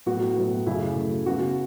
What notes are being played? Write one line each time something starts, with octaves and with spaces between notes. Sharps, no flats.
A2 F#3 B3 F#4
A2 F#3 B3
F#2 C#3 F#3 A3 E4
F#2 C#3 F#3 A3
C#3 F#3 B3 F#4